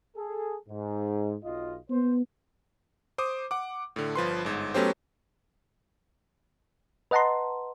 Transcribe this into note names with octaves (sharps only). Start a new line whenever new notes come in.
G#4 A4
G#2
B1 F4 D#5
B3 C5
C5 D6 D#6
F#5 D6
A2 D3
G1 F3 B4 C6
G1 G#2
F#3 A3 B3 C#4 G4 C5
B4 D#5 F#5 A5 A#5 C6